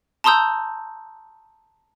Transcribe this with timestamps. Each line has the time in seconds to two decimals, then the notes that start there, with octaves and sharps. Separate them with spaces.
0.24 A5 A#5 C6 D#6 E6 G6